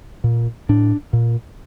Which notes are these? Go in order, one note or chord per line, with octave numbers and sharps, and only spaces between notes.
A#2
A2 D4
A#2